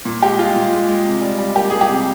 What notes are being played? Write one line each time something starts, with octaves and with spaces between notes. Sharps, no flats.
A#2
G#3 G4
G#3 F4
A#2
G#3
G#3
C3
G3
G3
A#3 G4
A#3 G#4
G4
C3